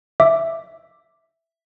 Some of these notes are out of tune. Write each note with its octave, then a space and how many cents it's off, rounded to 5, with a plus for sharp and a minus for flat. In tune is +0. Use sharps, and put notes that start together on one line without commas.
E5 +0 D6 +0